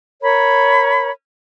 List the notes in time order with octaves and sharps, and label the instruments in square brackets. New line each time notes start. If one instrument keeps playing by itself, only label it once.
[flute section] A#4 C#5 B5